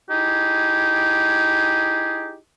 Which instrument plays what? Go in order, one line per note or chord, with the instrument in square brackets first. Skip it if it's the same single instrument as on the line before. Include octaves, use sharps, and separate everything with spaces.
[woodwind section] D#4 E4 G4 G#4